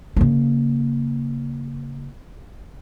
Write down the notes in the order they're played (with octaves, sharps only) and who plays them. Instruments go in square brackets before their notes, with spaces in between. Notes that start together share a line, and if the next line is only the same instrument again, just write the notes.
[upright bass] C#3 A#3